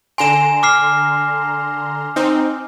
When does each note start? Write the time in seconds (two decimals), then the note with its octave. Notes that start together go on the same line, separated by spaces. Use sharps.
0.18 D3 G#5 A#5 C6 E7
0.63 D6 F6 C7
2.16 C4 D#4